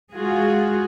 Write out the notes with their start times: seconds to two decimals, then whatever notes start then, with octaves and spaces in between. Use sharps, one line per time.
0.12 G#3 F4 F#4 G#4